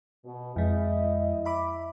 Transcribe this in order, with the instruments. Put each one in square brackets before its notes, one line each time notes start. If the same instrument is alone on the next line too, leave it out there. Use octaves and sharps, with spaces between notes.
[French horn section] B2
[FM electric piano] F2 G#3 [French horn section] E4 D#5
[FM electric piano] E5 B5 D6